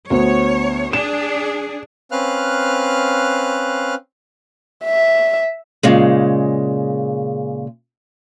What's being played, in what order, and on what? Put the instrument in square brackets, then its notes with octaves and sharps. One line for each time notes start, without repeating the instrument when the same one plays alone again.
[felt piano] D2 B3 C5 [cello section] C#5
[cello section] D4 G#4 [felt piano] E7
[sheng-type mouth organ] C4 C#4 B4 F5 F6 F#6
[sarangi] E5
[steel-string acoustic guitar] A#2 C#3 G#3